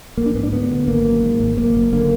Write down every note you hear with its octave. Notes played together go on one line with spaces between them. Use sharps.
A#1 A#3
D4
G#2 B3
D4
D2 B3
D3
G#1 A#3
F#2
G#2
G#1
F#1 A#3
F#1
D3 A#3